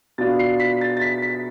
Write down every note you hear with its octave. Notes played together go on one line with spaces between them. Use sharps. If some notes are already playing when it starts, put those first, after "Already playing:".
B2 B3 D4 F4 A6
C7
B6
A6
A6
B6
B6